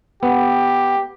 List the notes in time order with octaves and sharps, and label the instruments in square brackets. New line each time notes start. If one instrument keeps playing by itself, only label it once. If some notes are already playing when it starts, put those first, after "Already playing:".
[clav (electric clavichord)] B3 [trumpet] G4